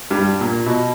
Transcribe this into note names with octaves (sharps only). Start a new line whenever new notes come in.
G2
A#2
B2